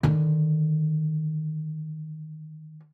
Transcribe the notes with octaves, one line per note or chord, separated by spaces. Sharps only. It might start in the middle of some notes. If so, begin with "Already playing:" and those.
D3 D#3